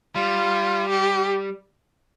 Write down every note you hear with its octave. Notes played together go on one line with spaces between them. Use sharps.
G3 F4
G4